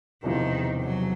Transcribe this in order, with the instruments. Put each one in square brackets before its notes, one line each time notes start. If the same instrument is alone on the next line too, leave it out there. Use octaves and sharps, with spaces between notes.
[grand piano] E1 E2 C3 F3 [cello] D#3
[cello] F#3